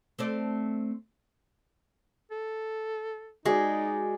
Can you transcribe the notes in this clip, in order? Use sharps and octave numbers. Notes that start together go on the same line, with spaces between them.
A3 C4 D5
A4
G#3 D#4 F#4 G#4 D5